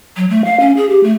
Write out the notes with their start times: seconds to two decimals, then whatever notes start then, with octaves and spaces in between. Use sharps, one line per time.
0.17 F#3
0.30 A3
0.45 F5
0.60 C#4
0.77 G#4
0.89 G4
1.03 A3